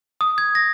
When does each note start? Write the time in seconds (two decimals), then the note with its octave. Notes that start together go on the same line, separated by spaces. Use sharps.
0.21 D#6
0.38 G#6
0.55 A#6